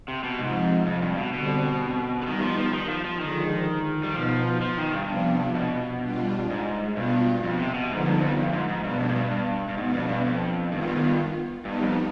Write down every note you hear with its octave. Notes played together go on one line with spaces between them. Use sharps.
C3
B2
G#2 C3 F3 C4
F2
G2
B2
B2 D3 G3 C4
D3
D#3 G3 B3 D#4
F3
F3
D#3
F3
F3
D3 D#3 F3 G#3
G3
B2 F3 B3 D#4
F3
D#3
G2
C3 F3 B3 D4
B2
G3 D4 F4
G#2
G2 B2 B3 F4
F2
C3
B2
G#2 D3 F3 B3 D#4
G2
F2
G2
G#2
G#2
G2 B2 B3 D4
F2
G#2
G2
G2
G2
G#2 B2 B3 D4
F2
G2
F2
G2 D#3 B3 F4
G#2
G2
G#2
G2
G2 G3 B3 D#4
F2